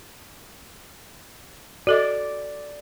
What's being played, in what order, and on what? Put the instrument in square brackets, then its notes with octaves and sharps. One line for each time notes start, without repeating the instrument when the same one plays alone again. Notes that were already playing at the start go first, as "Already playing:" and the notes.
[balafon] F#4 A4 D#5 [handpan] D5